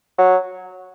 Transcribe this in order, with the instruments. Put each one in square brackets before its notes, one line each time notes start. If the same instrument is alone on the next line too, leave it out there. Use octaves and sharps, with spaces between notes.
[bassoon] F#3